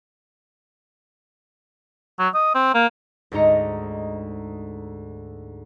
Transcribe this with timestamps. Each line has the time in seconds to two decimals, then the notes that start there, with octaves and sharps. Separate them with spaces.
2.19 F#3
2.34 D#5
2.54 C4
2.74 A#3
3.32 D2 G#2 G#3 D#4 A#5 C#7